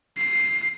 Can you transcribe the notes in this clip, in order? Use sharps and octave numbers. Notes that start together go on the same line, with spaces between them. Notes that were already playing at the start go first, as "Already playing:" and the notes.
C7